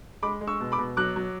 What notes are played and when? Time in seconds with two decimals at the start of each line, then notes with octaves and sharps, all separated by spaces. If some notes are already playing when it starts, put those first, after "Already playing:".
0.23 G#3 B5 D6
0.41 G#3
0.47 C#6 E6
0.60 B2
0.72 B5 D6
0.79 B2
0.97 F#3 D6 F#6
1.16 F#3